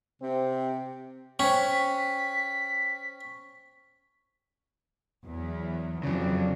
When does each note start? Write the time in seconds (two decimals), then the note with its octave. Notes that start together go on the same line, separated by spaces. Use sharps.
0.22 C3 C4
1.39 C#4 C5 G5 B6
5.25 E2 E3 F#3
6.03 F2 C#3 F#3 D4